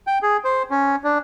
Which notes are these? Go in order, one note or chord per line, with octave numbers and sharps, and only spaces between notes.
G5
G#4
C5
C#4
D4